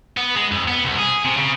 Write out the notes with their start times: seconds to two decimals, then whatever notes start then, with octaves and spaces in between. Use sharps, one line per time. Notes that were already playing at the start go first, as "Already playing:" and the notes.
0.17 B3
0.35 G#3
0.52 F2
0.68 B3
0.84 C2
0.98 G#4
1.25 C3
1.37 C#3